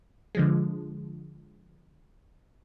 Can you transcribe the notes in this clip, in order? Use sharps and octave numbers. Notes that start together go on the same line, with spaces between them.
D3 F3 G#3